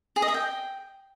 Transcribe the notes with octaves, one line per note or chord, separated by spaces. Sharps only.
G#4
D#5
E5
G5